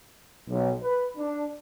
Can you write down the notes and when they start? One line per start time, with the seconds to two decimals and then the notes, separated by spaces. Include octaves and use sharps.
0.49 B1
0.83 B4
1.17 D4